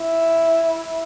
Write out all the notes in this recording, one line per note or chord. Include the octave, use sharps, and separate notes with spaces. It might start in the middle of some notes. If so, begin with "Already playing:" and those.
Already playing: E4